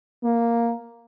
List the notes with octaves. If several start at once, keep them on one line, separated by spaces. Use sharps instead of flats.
A#3